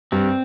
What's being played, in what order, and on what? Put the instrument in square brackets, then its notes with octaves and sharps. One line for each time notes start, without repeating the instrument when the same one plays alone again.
[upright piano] G2 [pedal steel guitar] C4